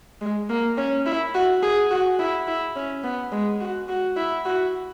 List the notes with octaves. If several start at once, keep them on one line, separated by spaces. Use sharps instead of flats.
G#3
A#3
C#4
E4
F#4
G#4
F#4
E4
E4
C#4
B3
G#3
F#4
F#4
E4
F#4